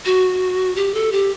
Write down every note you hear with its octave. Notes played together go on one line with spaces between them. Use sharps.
F#4
G4
A4
G4